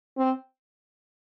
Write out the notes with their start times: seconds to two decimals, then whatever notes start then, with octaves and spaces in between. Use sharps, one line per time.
0.18 C4